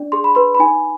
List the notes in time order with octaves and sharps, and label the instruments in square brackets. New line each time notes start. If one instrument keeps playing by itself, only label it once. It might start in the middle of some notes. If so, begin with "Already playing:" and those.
Already playing: [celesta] D4 D5
G#4 C6
B5
B4 C6
B5
D#4 G#5